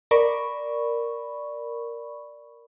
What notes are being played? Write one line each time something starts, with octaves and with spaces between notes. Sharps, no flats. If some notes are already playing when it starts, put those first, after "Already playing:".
A#4 D5 B5 C#6